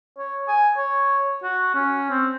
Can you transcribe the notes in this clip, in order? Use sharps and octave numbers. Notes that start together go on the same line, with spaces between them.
C#5
G#5
C#5
F#4
C#4
C4